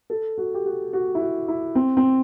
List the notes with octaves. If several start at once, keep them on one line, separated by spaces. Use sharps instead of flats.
A4
F#4
G4
F#4
F#4
E4
F#4
E4
C4
C4